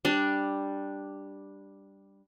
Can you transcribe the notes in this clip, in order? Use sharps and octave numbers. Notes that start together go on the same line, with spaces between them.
G3 D4